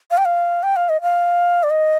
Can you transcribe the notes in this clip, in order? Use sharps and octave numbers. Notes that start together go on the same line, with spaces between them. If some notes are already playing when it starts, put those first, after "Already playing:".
F5
G5
F5
G5
F5
D#5
F5
D5
D#5